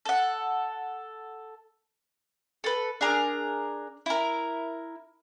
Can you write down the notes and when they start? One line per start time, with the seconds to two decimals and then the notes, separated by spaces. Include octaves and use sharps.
0.06 A4 F#5
2.64 A4 B4
3.01 D4 G#4 A#4
4.06 E4 A#4